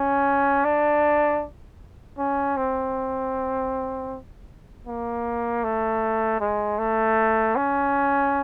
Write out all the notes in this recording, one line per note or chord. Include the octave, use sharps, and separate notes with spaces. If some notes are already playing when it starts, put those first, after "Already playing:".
Already playing: C#4
D4
C#4
C4
A#3
A3
G#3
A3
C#4